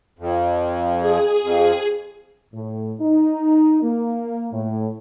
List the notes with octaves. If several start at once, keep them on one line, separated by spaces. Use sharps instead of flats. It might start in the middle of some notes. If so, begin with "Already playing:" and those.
F2
G#4
F2
A2
D#4
A#3
A2